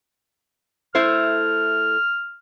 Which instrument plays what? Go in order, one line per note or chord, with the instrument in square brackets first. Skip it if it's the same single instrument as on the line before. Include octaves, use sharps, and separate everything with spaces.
[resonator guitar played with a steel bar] A3 E4 C5 [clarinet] F6